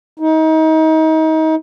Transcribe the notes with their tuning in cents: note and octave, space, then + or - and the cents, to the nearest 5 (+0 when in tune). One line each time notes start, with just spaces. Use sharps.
D#4 +30